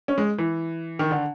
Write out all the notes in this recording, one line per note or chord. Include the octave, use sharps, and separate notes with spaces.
C#4
G#3
E3
D#3
D3